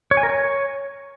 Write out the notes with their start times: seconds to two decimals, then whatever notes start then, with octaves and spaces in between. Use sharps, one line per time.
0.11 C#5
0.17 G#5
0.23 A#4
0.29 C#5